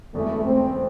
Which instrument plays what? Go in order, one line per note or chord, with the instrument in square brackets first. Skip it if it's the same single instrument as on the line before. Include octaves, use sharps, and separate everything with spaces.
[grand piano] E1 E2 C#3 E3 [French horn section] A3
[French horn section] C4